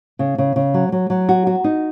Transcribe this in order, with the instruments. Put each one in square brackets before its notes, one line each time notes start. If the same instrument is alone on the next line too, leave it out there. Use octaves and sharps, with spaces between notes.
[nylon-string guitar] C#3
C#3
C#3
F#3
F#3
F#3
F#4
F#4
D#4